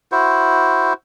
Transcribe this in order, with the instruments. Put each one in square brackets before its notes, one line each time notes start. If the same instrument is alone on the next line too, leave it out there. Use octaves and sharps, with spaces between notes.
[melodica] E4 F#4 C5